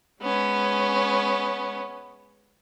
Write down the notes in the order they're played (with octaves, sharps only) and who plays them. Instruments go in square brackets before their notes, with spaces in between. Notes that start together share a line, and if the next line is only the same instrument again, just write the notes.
[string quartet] G#3 B3 C#4